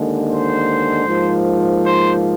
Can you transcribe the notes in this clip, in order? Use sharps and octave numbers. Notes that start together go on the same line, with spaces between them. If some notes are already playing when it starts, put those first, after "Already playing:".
Already playing: D#2 D3 G#3
C5
G#2 F3 A#3
C5